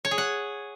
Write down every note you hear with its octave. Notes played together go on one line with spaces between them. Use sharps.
C#5
G#4
F#5